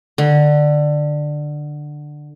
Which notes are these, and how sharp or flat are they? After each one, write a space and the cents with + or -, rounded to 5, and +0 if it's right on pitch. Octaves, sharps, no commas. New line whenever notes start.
D3 +15 B5 -35